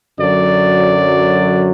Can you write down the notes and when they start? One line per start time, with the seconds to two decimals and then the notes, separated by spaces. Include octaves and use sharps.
0.18 F#2 D3 F#3 D5